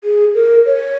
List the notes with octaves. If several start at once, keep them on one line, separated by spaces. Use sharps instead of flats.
G#4
A#4
C#5